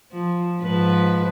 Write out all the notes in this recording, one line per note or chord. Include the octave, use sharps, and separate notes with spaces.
F3
G#2 F3 B4